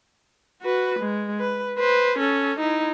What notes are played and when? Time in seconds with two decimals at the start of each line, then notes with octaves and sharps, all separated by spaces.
0.62 F#4 B4
1.00 G#3
1.40 B4
1.79 B4 C5
2.19 C#4 A4
2.60 D#4 E4